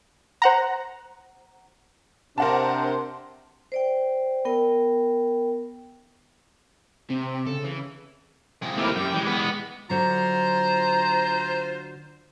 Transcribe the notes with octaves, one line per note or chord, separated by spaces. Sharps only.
C5 F#5 A#5
C3 D4 A#4 C5 F#5 A5
C5 D5 G5
B3 A#4 G5
C3 C4
C#3 A4
E3
C3 G#3
D#2 C3 A3 E4 A#4 D6
F#2 G4 G5
E3 G#3
B3
D3 F#3 F4 C5 A#5